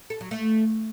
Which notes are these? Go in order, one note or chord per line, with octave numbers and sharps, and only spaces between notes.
A4
F#3
A3